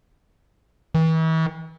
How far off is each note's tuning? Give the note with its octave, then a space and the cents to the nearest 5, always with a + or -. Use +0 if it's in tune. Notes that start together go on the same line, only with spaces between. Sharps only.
E3 -40